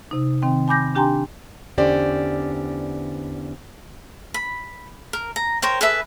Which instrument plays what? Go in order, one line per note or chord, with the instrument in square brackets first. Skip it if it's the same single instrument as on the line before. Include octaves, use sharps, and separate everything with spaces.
[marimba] C3 D#4
D#3 C4 G5
G#5 B5 D6 G6 A#6
D4 G4 G5 G#5 A#5 C6
[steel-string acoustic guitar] E2 D3 C#4 G4 C5 D5
[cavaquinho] B5
A#4
A#5
A#4 C5 C#5 G5
G#4 A4 B4 E5